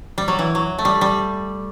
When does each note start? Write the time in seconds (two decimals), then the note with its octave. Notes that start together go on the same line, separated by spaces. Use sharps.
0.18 G3
0.28 F#3
0.39 E3
0.55 F#3
0.79 A3
0.85 G3
1.01 G3